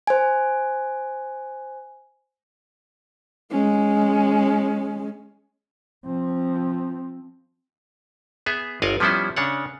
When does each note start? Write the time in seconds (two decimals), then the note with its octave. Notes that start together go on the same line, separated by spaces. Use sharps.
0.07 C5 G#5
3.51 G#3 C#4
6.06 F3 C4
8.46 B3 G#4 E5
8.82 G1 D5 D#5 F5 F#5 G#5
9.00 F3 G3 B3 C#4 E4 C5
9.36 C#3 D4 C#5 F#5